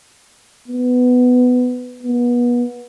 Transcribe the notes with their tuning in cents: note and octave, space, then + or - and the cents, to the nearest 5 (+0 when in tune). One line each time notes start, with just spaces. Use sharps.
B3 +10
B3 -30